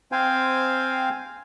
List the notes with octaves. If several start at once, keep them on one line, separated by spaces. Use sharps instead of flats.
C4 C5 F5 G5 G#5